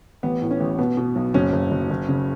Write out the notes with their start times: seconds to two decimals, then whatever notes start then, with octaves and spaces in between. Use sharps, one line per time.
0.23 A1 B3
0.42 A2
0.51 C#4
0.60 A1
0.79 B2 B3
0.97 B2
1.16 B1
1.34 F#1 C#4
1.53 F#1
1.71 F#1
1.90 F#1
2.08 C#3